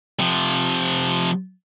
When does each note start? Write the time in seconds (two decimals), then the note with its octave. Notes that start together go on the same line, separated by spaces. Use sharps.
0.19 C3 F3